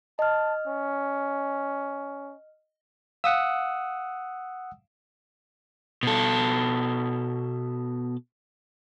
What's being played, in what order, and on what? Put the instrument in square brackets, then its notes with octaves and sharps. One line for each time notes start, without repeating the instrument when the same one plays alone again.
[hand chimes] D#5 F6 [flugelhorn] A5
[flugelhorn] C#4
[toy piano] F5 [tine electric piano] F#5 D#6 E6
[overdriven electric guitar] B2 A4